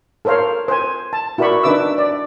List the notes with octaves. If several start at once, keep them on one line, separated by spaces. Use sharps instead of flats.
A4 A#4 C5 C#5 F5
C5 G#5
A5
E4 F#4 A#4 D5 B5 C#6
D4 D#4 B4 E5 D6 E6
D5